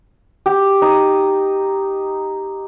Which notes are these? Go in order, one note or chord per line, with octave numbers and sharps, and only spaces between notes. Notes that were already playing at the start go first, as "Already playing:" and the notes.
G4
D#4